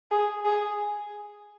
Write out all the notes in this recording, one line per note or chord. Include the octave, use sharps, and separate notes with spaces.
G#4
G#4